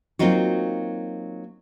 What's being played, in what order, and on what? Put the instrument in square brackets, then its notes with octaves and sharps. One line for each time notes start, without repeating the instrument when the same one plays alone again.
[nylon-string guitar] F#3 A#3 C4 D#4 F4 F#4